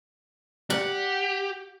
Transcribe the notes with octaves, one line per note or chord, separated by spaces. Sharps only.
G4 F#5